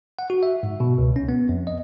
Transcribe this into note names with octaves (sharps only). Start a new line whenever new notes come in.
F#5
F#4
E5
G#2
B2
C#2
C#4
B3
F2
D#5